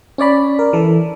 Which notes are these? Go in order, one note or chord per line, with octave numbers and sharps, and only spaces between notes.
C#4 C#5 D5 B5
A#4
E3 A4